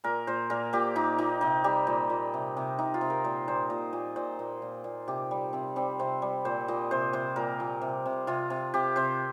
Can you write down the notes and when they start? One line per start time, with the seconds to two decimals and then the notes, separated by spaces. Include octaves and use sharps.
0.04 A#2 A#4
0.27 A#2 C5
0.50 A#2 A#4
0.73 A#2 G4
0.96 A#2 D#4
1.18 A#2 D#4
1.41 C3 D#4
1.64 G3 G4
1.87 A#2
2.10 A#2
2.34 C3
2.57 C3
2.78 C3 D#4
2.94 F4
3.01 C3
3.10 A#4
3.24 A#2 C5
3.48 A#2 C5
3.70 A#2 D#5
3.93 A#2
4.16 A#2 C5
4.39 A#2
4.62 A#2
4.84 A#2
5.08 C3 G4
5.31 G3
5.53 C3 C4
5.76 G3 C4
5.99 C3 C5
6.22 G3
6.45 A#2 C5
6.68 A#2 D#5
6.91 C3 C5
7.13 C3 C5
7.36 A#2 A#4
7.60 A#2
7.82 C3
8.06 C3
8.27 C3 F4
8.50 C3
8.74 C3 G4
8.96 C3 C5